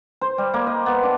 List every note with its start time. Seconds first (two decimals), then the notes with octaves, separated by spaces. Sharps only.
0.21 C5
0.38 G3
0.54 A#3
0.67 D#5
0.86 B3
1.03 D4